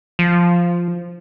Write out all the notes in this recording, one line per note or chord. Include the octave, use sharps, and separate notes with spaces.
F3